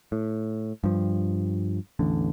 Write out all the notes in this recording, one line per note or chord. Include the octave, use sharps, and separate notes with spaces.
A2
G2 F3
A1 E2 D3